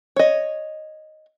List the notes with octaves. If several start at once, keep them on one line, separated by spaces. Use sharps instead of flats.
C#5 D#5